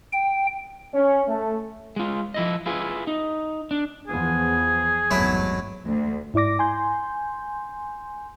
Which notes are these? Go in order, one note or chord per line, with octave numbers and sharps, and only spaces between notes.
G5
C#4
A3
G#3 F4
F3 E4 D#5
E4 F4 G#4 B4
D#4
D4
E2 F3 B3 G#4
G#1 E2 G2 F#3 A3 E4
D2
G#2 E4 D5 D6 A#6
G#5 C6 G6